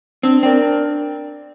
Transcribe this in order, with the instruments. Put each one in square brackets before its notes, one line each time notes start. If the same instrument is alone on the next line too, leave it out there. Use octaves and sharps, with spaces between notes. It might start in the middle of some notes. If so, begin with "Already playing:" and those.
[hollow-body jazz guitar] C4 [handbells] D4
[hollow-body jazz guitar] C4 [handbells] A#4 D5 G5
[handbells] D4